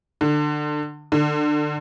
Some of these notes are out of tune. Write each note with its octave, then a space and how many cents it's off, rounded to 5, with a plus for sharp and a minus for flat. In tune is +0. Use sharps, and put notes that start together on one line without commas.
D3 +25
D3 +30